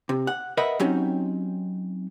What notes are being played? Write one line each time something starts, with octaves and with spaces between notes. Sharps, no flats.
C3
F#5
A#4 B4 D#5 E5 F#5 B5
F#3 C4 C#4 D#4 G4